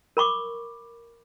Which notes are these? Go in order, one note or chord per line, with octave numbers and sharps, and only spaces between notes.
A#4 B5 C#6 D6